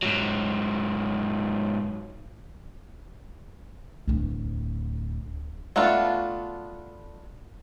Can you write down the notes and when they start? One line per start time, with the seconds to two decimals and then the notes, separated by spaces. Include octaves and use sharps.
0.03 G#2 F#3
4.08 D1 A2
5.76 A3 B3 D4 F4 F#4